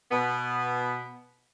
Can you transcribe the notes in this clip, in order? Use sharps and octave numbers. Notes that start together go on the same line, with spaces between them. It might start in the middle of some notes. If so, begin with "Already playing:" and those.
B2 B3